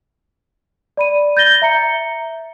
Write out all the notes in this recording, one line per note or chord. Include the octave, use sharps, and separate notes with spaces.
D5 B5 D#7
G6 A6 A#6 G7
E5 A#5 C#7